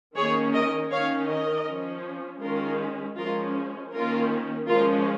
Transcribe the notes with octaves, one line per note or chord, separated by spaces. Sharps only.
D#3 A#3 C#4 G#4 C#5
A#4 D#5
D#3 C#4 C#5 F5
A#4 D#5
F3 C#4
D#3 G#3 C#4 F4 A#4
F3 G#3 C#4 F4 A#4
D#3 A#3 C#4 F4 A#4
F3 G#3 C#4 F4 A#4